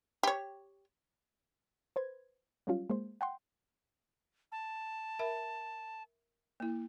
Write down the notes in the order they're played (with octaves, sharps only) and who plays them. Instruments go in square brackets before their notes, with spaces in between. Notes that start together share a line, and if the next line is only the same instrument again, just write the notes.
[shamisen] G4 C#5
[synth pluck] B4 C5 G#6
F#3 G3 C#4 F4
G#3 A#3 C5
F#5 G5 C6
[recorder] A5
[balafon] A#4 E5 B5
A#3 E4